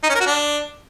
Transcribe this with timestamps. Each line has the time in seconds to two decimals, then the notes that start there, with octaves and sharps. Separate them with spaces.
0.03 D#4
0.09 C#4
0.15 A#4
0.21 F#4
0.26 D4